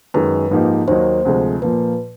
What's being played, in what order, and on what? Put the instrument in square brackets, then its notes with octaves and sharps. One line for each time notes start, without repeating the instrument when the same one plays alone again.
[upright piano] F#2 D#3 G#3 [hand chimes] B4
[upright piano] G#2 F3 A#3 D#4 G4
[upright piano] D#2 D#3 F#3 A#3 D#4 [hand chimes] C5
[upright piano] D2 C3 F3 G#3
[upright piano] A#2 F3 A#3 [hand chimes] B4